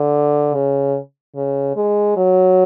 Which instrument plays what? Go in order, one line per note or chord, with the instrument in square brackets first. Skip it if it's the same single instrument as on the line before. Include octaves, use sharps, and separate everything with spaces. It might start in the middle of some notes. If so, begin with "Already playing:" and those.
Already playing: [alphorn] D3
C#3
C#3
G#3
F#3